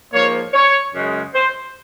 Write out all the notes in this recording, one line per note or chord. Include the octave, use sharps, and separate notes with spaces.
G#2 F3 A#3 C#5
C#5
F#2 C#3 G#3
C5